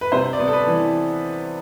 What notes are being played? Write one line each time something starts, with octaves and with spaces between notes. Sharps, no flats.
B4
C3 C5
D5
B3
A4
B4
E3